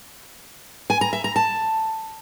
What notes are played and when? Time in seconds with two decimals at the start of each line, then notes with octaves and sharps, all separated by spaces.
0.90 G#5
1.01 A#5
1.13 E5
1.24 A#5
1.36 A5